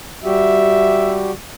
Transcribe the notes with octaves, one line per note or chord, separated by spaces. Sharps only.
G3 F#4 G4 E5